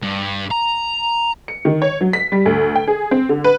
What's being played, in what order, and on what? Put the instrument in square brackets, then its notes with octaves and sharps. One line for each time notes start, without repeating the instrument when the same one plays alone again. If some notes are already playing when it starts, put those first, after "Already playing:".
[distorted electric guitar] G2
A#5
[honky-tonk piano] C#7
D#3
C#5
F#3
B6
G3
D2
G5
G#4
C4
D3
B4